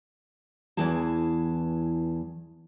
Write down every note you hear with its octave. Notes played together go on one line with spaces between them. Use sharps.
E2 E3 G#4 A5